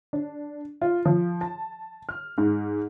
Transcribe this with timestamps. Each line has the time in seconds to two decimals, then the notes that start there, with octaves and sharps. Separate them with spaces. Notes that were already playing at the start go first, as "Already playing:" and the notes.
0.13 D4
0.82 F4
1.05 F3
1.41 A5
2.09 F6
2.38 G#2